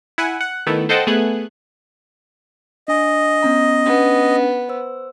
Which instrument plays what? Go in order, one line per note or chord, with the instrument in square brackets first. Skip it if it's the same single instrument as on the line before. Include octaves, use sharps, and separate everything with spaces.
[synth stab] E4 F#5 G#5
F#5
D#3 A3 B3 E4
A4 C5 D#5 F#5 G5 A5
A3 B3 G#4 F#6 G#6
[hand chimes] D4 G#5 [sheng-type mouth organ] D#5
[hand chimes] B3 C#4 A#5
[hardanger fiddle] B3 [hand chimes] C#4 D4
[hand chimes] C5 E6